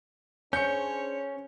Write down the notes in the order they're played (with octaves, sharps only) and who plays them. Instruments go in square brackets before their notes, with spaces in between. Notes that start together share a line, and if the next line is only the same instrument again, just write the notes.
[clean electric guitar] C#4 [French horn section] D4 G#4 C5 [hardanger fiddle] C#5 [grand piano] G6 C#7